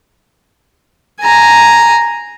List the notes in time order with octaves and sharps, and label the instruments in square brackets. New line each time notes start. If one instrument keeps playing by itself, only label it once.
[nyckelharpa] G#5 A#5